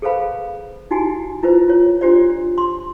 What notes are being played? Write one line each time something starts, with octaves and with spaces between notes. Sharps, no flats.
G#4 A4 B4 C5 F5 B5
D#4 E4 F#4 G4 G#5
E4 F4 B4 C5
F4 C#5
D4 F4 G4 C5 D5
C6